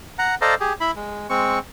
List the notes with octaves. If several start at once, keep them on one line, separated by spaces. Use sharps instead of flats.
F#5 A#5
A4 C5 D5 D#5 F5 A#5
G4 G#4
E4 B5
G#3
G#3 C4 C#6